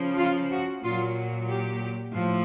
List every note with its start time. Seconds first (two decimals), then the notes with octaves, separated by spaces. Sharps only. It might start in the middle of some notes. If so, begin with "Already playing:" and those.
Already playing: C#3 F3
0.18 F4
0.52 F#4
0.83 A#2 F#3 F4
1.49 G4
2.14 A2 F3